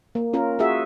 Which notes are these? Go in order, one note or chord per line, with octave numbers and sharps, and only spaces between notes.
A#3
C#4 F4 A#4
F4 F#4 G#4 E5